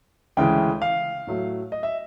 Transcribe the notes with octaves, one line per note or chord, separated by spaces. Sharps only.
D2 C#3 E3 G#3 G5
F5
A2 F#3 A3
D#5
E5